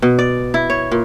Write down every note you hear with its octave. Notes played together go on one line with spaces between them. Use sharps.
B2
D5
E4
C#5
A#2